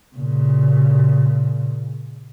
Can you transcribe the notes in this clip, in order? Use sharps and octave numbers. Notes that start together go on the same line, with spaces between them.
A#2 C#3